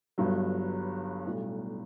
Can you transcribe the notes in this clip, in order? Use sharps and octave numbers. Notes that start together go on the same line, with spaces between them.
G1 G2 F#3
B1 A2 G3